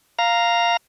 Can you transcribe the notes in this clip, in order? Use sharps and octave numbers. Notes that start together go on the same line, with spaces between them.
F5 A#5